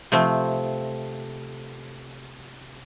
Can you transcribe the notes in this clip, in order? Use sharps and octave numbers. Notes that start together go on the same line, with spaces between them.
C3 F3 A3 C4